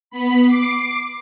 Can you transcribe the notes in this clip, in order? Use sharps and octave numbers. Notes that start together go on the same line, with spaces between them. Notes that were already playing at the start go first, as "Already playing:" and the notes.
B3 B5
D6 C7